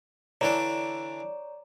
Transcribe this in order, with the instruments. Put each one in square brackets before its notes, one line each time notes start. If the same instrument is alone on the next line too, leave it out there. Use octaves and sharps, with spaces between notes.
[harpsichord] D3 E3 D4 [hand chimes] C#5 A#5 [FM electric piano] D5